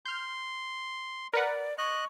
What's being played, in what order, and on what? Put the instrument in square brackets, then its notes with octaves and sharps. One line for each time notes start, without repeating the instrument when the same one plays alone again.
[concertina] C6 [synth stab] F6 G6
[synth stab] A#4 B4 F#5 [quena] D5
[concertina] D#5 F#6 [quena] C#6